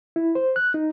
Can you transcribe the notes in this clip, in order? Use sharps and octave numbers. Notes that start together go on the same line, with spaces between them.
E4
C5
F#6
D#4